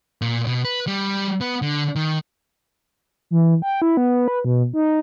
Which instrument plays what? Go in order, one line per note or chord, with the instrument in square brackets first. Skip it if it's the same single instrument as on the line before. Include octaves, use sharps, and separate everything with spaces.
[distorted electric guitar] A#2
B2
B4
G3
B3
D3
D#3
[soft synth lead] E3
G5
E4
B3
B4
B2
D#4